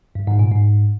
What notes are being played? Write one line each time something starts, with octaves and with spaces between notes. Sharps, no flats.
G2
G#2
A#2
G#2